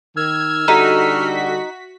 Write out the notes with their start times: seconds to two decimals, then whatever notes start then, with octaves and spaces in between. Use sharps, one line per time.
0.17 D#3 E6 F6 G#6
0.68 D3 G3 D#4 F#4 A4 B6